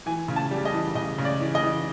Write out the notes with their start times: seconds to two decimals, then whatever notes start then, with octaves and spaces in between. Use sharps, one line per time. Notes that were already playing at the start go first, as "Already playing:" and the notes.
0.06 E3 G#5
0.28 C#3
0.36 A5
0.51 G3
0.65 D#5
0.73 E3
0.95 C#3 D#5
1.18 C#3
1.25 D5
1.40 E3
1.55 D#5
1.62 E3